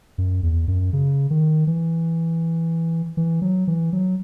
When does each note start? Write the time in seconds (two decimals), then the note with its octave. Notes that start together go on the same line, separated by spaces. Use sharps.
0.18 F#2
0.43 E2
0.68 F#2
0.93 C#3
1.30 D#3
1.67 E3
3.17 E3
3.42 F#3
3.67 E3
3.93 F#3